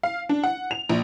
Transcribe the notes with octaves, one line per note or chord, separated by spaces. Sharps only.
F5
D4
F#5
F7
A#1